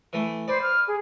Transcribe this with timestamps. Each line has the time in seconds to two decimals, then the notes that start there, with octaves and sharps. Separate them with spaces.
0.13 E3 A3
0.48 B4 C5 D5
0.62 F6
0.88 G#4